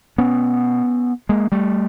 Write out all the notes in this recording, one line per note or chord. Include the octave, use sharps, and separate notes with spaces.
B2 B3 C#4
G#3 A#3
G3 A3